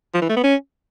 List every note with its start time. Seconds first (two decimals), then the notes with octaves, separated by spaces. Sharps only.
0.15 F3
0.22 E3
0.29 A3
0.36 B3
0.44 C#4